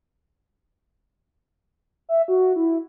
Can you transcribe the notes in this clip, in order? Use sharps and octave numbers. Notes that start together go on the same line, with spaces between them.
E5
F#4
E4